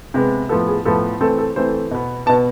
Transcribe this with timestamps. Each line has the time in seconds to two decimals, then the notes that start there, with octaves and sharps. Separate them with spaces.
0.14 C3 G#3 B3
0.49 A2 F3 B3 A4
0.68 G#4
0.85 A2 F3 B3 A4
1.21 E3 A3 C4 A4
1.38 A4
1.56 E3 A3 C4 C5
1.91 B2 B3
2.26 B3 A5
2.29 B2